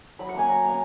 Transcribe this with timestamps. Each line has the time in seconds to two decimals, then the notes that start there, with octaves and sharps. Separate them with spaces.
0.19 F#3 B5
0.29 F#5
0.34 A#3 C#4 G#5
0.49 F#3 A#5
0.64 A#3 C#4